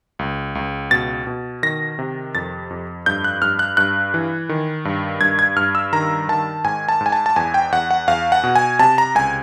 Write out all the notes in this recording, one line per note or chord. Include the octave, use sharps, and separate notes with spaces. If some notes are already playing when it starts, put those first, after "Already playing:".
C#2
C#2
B2 A6
B2
D#3 A#6
C3
F2 A6
F2
G2 G6
F#6
G2 F6
F#6
G2 F#6
E3
D#3
G2
G2 G#6
G#6
G2 F6
E6
D#3 A#5
D#3 A5
G#2 G#5
A5
G#2
G#5
A5
A5
E2 G#5
G5
E2 F#5
F#5
E2 F5
F#5
B2
G#5
C3 A5
A#5
C#2 G#5